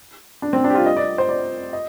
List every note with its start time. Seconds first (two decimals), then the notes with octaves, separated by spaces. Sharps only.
0.42 D4
0.53 C4
0.64 D4
0.70 G4
0.75 F4
0.86 D#5
0.97 D5
1.18 C5
1.29 D5
1.73 D#5